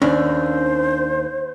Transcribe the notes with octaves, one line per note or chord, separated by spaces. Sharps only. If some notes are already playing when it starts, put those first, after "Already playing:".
D#2 C#4 D4 C5